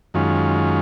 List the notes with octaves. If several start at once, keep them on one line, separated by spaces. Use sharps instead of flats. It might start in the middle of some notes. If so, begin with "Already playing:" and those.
F#2 D#3 G#3 C#4 F4